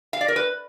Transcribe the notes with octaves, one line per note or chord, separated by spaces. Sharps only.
F5
D5
A#4
B4